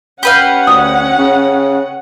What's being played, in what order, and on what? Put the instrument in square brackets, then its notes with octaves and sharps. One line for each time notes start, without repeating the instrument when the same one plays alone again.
[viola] C#4 F#5 [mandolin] G4 B4 F5
[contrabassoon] D2 [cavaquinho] D#6
[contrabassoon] C#3